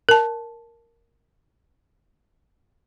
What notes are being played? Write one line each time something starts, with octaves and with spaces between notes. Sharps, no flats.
A#4 A5